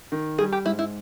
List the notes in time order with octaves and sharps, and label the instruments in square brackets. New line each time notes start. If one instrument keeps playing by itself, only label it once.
[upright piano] D#3
[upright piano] G3 [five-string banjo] G#4
[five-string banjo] G4
[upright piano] G#2 [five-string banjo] E4
[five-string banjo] E4